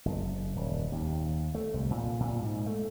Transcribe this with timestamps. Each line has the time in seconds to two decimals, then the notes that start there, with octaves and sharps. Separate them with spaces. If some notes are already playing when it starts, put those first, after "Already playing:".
0.05 F#1
0.56 D#1
0.92 D#2
1.55 A3
1.74 C2
1.91 A#2
2.20 A#2
2.42 G#2
2.66 A3